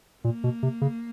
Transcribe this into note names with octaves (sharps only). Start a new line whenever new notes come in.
A#2 A#3
B2
C3
C#3